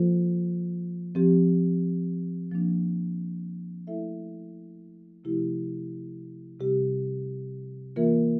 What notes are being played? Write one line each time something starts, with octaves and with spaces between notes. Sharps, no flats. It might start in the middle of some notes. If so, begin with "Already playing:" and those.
Already playing: F3 A#3 F4 A4 C5
F3 C4 G4
F3 A#3 D4
A3 E4 A4 E5
C3 F3 A3 E4 G4
C3 G3 C4 G4
E3 A#3 F4 A#4 E5